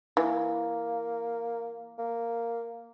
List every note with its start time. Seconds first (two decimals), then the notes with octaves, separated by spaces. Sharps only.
0.17 E3 A#3
1.98 A#3